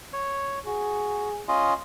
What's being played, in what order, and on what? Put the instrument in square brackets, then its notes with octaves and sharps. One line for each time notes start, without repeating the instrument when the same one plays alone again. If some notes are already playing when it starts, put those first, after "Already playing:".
[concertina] C#5
[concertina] F#4 [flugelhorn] G#4
[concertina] C#4 F4 D#5